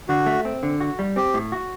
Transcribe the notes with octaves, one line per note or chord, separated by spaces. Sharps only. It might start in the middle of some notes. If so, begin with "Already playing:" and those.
D3 F#4
A3
C4
D3
F#4
G3
C4 G4
A2
F#4